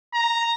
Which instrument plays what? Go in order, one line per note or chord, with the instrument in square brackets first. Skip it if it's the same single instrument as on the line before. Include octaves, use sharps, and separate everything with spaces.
[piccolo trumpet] A#5